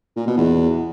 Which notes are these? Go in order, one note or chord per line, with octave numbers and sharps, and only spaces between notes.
A#2
B2
E2